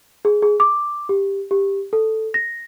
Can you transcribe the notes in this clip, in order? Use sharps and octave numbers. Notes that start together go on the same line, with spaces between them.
G#4
G#4
D6
G4
G4
A4
A#6